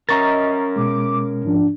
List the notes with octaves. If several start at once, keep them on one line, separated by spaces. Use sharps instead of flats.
C#4 A#4 D#5 A#5 C#6 A6
B2 G#3 D6
G#2 F3 D4